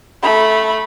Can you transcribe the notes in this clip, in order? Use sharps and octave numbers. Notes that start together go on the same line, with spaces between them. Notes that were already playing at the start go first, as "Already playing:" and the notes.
A3 B5